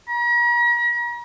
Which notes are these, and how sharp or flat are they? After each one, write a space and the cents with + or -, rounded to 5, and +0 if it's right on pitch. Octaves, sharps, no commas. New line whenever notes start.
A#5 +45